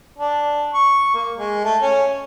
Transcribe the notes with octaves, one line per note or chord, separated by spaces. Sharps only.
D4
C#6
A#3
G#3
A3
C#4